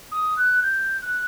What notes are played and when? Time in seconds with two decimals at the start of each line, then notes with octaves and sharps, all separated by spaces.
0.12 D#6
0.37 F#6
0.63 G6
1.02 F#6